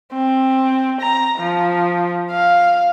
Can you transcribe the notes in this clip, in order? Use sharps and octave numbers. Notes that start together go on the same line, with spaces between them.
C4
A#5
F3
F5